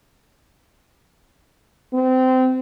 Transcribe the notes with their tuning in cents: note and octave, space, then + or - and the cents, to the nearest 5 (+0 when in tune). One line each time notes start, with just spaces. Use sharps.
C4 -25